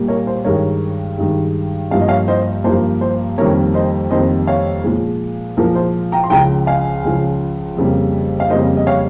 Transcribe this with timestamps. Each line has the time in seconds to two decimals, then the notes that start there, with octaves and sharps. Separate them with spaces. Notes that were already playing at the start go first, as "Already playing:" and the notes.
Already playing: A#2 G3 A#3
0.08 A#4 C#5
0.27 C5
0.45 G2 D#3 G#3 A#4 C#5
1.18 G2 D#3 G#3
1.91 G2 F3 A#3 F5
2.00 D#5
2.08 C#5 F5
2.28 C5 D#5
2.64 G2 F3 A#3 C5
3.01 C5
3.38 F2 D#3 G3 A#3 A#4 C#5
3.74 C5 D#5
4.11 F2 D#3 G3 A#3 C5 D#5
4.47 C#5 F5
4.84 A#2 F3 G#3
5.57 A#2 F3 G#3 A#4
5.75 C5
6.12 G5 A#5
6.24 C6
6.30 C#2 C#3 F3 G5 A#5
6.67 F5 G#5
7.04 C#2 C#3 F3
7.77 F2 C#3 G3 A#3
8.40 F5
8.50 F2 C#3 G3 A#3 C5 D#5
8.77 D#5
8.87 C#5 F5